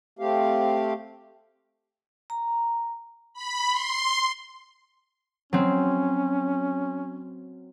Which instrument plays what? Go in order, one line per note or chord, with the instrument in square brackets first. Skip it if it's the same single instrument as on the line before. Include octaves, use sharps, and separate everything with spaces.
[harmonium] A3 C4 G4 F5
[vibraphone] A#5
[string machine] B5
C6
[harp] F#3 C4 [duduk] C#4